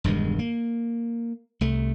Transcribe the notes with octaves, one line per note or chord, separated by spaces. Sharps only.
E1 G2 D#3 G#3
A#3
C2 A3